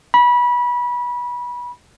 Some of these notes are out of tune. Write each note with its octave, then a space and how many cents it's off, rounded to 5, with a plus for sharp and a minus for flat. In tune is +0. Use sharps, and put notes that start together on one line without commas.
B5 -25